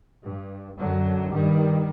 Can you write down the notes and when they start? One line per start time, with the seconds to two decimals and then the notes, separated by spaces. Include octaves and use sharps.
0.24 G2
0.78 F#2 D3 F#3
1.31 G2 D#3 G3